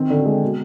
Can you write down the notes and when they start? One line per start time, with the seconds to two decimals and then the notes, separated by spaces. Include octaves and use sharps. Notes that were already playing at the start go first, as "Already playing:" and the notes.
Already playing: D#3 C4
0.10 D3
0.25 G#3
0.42 B2